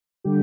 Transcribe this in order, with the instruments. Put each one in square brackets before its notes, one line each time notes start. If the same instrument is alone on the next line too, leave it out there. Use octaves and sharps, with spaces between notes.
[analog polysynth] D3 G3 G4